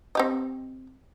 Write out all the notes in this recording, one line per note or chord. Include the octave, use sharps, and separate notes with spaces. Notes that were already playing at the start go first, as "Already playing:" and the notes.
C4 G4 D#5